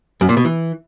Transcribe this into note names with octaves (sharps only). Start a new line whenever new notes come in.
F#2
A#2
B2
E3